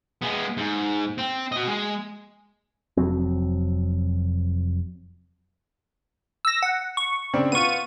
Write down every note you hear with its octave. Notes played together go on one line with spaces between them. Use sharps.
G#3 B3
G#2
C4
F#4 D#5
G#3
F1 F2 F#3 C4
E6 A#6
F#5
C#6
C#3 C4 D4
B3 F4 C#6 D#7